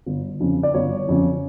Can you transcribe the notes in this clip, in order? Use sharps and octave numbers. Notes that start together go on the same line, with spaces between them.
G1
F2 C#3
D5
G1 C#5
F2 C#3